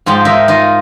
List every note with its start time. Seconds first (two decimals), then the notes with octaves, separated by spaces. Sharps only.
0.06 G#2 F3 G#3 G5 A5
0.25 D#4 A#4 E5 G#5
0.48 D#4 F4 D#5